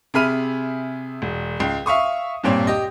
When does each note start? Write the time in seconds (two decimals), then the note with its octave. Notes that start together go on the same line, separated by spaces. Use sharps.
0.14 C3 G#4 E5 B5 F6 D#7
1.22 E1
1.60 C#2 G5
1.86 E5 F5 C#6 D#6
2.44 G2 A#2 C4 C#5
2.67 G4 D#5